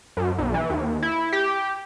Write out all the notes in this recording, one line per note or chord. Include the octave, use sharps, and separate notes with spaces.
F#2
B1
E3
D#2
E4
G4